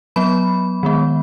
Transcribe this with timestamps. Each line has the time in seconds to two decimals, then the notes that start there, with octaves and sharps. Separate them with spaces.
0.16 F#3 B3 B5
0.83 D#3 G#3 B3